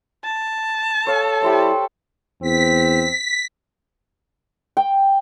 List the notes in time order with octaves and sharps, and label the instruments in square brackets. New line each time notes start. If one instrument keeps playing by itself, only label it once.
[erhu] A5
[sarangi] A4 [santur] C#5 F5
[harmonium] G3 E4 [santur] G4 C5 C#5
[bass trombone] E2 [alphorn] C4 [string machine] B6
[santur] G5